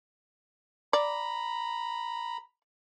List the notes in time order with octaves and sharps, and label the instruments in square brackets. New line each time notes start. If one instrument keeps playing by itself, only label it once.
[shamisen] D5 [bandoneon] A#5 B5